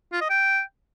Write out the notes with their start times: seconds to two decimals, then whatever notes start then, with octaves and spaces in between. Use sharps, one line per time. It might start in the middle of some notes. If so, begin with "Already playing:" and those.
0.13 F4
0.21 D#5
0.30 G5